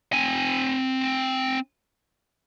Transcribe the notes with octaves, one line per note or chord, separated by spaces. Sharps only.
C4 G#5